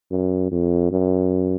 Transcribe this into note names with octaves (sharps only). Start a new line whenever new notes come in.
F#2
F2
F#2